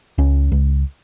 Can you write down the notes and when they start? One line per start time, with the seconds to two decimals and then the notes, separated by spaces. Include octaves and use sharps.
0.18 C#2 C#4
0.52 C#2